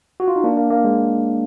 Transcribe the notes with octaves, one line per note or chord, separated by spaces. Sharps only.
F#4
F4
D#4
A#3 D4
A#3
A#3
G#3